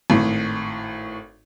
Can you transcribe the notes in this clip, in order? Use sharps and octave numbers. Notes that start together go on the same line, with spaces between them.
G#1 A2